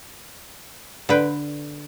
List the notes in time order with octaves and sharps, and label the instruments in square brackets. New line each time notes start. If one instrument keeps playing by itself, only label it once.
[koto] D3 B4 G5